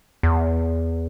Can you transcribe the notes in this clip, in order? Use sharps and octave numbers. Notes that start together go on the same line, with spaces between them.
E2